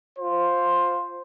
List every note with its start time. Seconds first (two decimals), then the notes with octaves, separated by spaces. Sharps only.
0.19 F4 C5